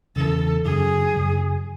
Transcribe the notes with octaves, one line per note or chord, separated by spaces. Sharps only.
E2 C#3 E3 A4
F#2 C#3 F#3 G#4
F#2 C#3 F#3